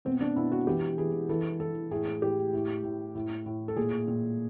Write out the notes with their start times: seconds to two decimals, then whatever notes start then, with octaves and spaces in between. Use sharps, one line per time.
0.05 B2 C4
0.21 D4
0.36 B2 E4
0.52 F#4
0.67 E3 G4
0.98 E3 G#4
1.29 E3 A4
1.60 E3 A4
1.91 A2 G#4
2.22 A2 G4
2.53 A2
2.84 A2
3.15 A2
3.46 A2
3.68 A4
3.76 A#2 G#4
4.08 A#2